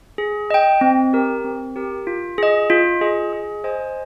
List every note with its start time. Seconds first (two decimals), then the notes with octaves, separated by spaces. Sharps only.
0.18 G#4
0.50 D#5 G5
0.81 C4
1.13 G4 A#4
1.44 C4
1.76 G4 A#4
2.07 F4
2.38 G#4 D#5
2.70 F4
3.01 G#4 D#5
3.33 G#4
3.64 C5 D#5 G#5